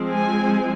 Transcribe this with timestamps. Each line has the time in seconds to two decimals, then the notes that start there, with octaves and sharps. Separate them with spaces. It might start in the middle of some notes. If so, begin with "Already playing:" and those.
Already playing: F3 G#3 C4
0.12 G#5